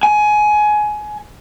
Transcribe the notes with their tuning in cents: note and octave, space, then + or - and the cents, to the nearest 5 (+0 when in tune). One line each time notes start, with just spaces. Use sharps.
G#5 +20